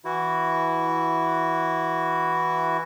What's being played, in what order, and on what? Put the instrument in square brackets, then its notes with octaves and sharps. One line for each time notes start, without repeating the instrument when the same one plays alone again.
[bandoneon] E3 E4 F#4